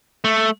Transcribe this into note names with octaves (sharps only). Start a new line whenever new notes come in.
A3